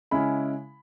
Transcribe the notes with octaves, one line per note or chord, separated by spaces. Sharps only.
C#3 G#3 C#4 E4 B5